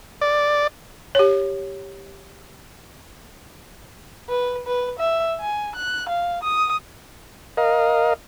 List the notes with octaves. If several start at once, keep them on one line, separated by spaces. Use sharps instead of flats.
D5
G4 C#5
B4
B4
E5
G#5
F#6
F5
D#6
A#4 D#5 F5